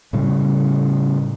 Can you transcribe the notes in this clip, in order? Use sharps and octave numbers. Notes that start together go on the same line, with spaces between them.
A2 C#3 G3